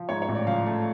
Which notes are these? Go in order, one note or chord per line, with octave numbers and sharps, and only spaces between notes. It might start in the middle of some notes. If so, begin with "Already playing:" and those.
Already playing: F3
G#2 C#5
C#5
A1
D5
F3 F5
A3